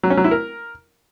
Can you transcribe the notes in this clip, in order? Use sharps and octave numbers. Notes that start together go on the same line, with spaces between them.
F#3
C#4
F#3
E4
A#4